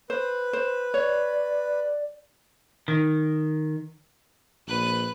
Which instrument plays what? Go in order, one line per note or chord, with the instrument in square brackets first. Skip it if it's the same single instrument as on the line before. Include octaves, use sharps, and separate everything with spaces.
[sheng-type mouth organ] B4 [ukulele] C5
[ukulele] C5
[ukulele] C#5 [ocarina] D5
[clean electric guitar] D#3
[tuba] A#1 [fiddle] B4 F#6